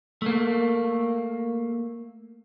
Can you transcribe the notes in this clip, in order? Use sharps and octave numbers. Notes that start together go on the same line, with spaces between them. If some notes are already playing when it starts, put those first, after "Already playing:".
A3 A#3